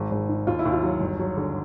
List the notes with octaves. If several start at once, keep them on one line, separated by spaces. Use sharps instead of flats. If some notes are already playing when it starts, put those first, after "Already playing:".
Already playing: G#1
G#1
D#3
D#2 F4
E4
D#2
F4
F#3
G1
F#3
D3